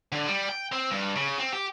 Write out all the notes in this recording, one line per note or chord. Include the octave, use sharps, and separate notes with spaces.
D3
G3
G5
C4
G2
C#3
C4
G4